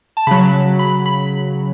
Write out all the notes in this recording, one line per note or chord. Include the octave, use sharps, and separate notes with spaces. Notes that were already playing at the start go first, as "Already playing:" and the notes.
A5
C#3 F#3 B5
B5
B5